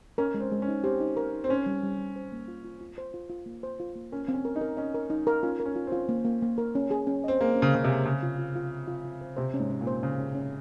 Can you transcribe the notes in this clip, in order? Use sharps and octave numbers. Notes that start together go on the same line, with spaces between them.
C#4 A#4
G#3
C4
G#3
C#4
D#4
C4 G4
D#4
A#4
D#4
C4
C#4 C5
G3
G3
G3
C5
A#3
F4
F4
F4
C5
F4
F4
A#3
C5
F4
A#3
C#4 A#4
C4
C#4
A#4
D#4
A#4
C#4 D#5
A#4
D#4
A#4
C#4 F4
A#4
C#4
F4
C4
F4
A#3
A#3
A#3
A#4
C#4
G#4
C#4
C4 D#5
A#3 G#4
C#4
C#3
C#3 D#5
C3
G#4
C#3 C5
F4
F4
F4
F4
F4
F4
C5
C3 C5
C#4
G#2
C#4
A#2
C5
C#3 G#4
C#4
C#4